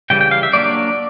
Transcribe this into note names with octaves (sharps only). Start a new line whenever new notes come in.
C#3 E3 G3 G5
G5
F5
E5
F#3 A#3 D4 D5